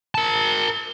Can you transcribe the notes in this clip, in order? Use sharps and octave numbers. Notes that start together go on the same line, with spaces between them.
A#4 A5